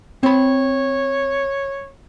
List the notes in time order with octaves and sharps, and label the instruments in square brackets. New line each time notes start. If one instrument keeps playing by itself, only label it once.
[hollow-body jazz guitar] C4 B5 [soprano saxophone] C#5